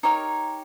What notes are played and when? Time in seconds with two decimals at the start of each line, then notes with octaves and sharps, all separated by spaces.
0.03 D#4 G4 A#4 C#5